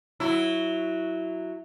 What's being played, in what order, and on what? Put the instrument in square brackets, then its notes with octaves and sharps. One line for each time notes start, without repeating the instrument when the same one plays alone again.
[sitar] F#3 E4